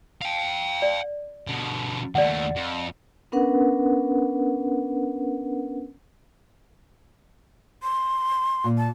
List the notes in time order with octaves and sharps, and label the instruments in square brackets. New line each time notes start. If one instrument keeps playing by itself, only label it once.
[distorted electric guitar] F5 G5
[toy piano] D5
[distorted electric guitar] B2 D3
[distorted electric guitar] D#2 A3 [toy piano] D5 F#5
[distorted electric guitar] F2
[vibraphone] B3 C#4 D4 A#4 B4 F#5
[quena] C6
[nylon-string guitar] A#2
[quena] A5